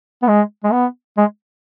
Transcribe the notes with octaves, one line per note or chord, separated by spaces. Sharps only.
B3
G#3
G#3
B3
G#3